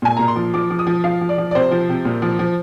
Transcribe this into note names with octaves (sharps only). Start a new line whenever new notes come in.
A#2 G#5
A#2 A#5
C6
F3
F3 D6
F3
D#6
F3
F3 F5
F3
D5
F3
D5
C3 C5
F3
C3
A#2
F3
F3